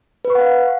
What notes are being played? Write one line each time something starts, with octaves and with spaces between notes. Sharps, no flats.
B4
C#6
F#5
F5